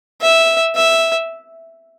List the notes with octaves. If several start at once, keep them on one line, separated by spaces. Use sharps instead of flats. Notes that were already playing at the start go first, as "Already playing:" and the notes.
E5
E5